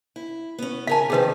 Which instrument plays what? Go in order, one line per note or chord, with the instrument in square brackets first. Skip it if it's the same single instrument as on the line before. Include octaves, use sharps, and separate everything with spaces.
[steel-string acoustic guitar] E4
B3 C#4
[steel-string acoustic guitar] C#3 A#4 G#5 [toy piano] F5 A5
[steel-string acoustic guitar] C3 D#3 F3 [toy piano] G#4 B4